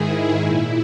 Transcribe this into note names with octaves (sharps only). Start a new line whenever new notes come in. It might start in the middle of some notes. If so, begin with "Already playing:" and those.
Already playing: G#2 D#3 E4 G#4
A#2